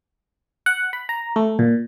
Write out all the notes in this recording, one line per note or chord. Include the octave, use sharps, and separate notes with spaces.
F#5
B5
A#5
A3
A#2